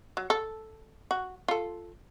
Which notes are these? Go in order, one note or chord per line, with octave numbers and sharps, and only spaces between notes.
F#3
A4
F#4
F4 A4